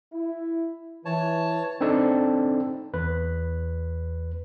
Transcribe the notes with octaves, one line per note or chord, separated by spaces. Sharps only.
E4
E3 C#5 A5
C4 D4 D#4 A4 D5
E2 B4